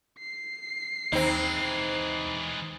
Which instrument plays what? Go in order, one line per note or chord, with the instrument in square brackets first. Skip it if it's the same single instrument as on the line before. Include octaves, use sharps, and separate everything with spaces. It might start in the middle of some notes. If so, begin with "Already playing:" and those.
[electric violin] C7
[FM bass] D#2 [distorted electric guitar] E3 G#3 [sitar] C4 D#4